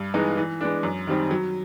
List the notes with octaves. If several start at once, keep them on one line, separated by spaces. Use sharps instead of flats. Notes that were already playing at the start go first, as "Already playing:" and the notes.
Already playing: G2
E3 G#3 B3 D#4
E3
G#3 B3 D4
F#2
D#3 G3 C4 D#4
F#3